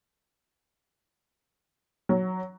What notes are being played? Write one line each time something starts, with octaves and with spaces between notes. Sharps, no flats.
F#3